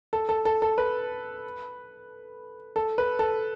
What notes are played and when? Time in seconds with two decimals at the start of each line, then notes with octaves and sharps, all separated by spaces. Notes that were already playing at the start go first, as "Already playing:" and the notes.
0.13 A4
0.29 A4
0.45 A4
0.62 A4
0.78 B4
2.76 A4
2.98 B4
3.19 A4